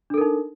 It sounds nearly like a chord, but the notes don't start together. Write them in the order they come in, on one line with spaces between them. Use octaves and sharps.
D4 A4 A#4 D#4